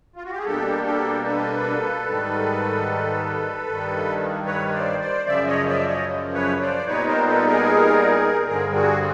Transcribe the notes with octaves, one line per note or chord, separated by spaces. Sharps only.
F4
F#4
G4
G#4
B2 G3 A#3 D4 G4 A4
G4 A4
A4 B4
G#2 D#3 G3
G2 D#3 G3
B4 C#5
C#5
C5 D5
C5 D5
F#2 C#3 F3 D5 E5
C#5 D#5
D5 E5
C#5 D#5
B4 C#5
C5 D5
A#2 G3 B3 D#4 B4 C#5
A#4 C5
A4 B4
G#4 A#4
G2 D3 G3 C4 G#4 A#4
F#4 G#4